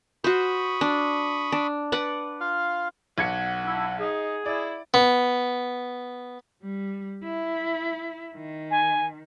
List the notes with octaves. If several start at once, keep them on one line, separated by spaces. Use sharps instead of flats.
F#4 C5 B5 C#6 D#6
D4
D4
B4 D5 F#5
F4 F5
B1 F#5 G#6 C#7
D4 E4
D#4 G#4
E4 D5
B3
G3
E4
D#3
G#5